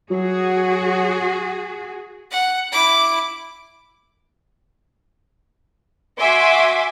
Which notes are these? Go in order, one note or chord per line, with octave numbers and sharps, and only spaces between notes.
F#3 F#4 G#4
F#5
E4 D6
F#4 E5 G#5 C6 D6